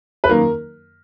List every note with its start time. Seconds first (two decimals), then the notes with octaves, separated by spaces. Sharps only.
0.24 B4
0.29 F#2 D#3 A#3 A#4